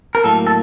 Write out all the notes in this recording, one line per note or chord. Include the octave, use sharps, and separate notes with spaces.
A#4
A2 F#3 A#3 A4
A4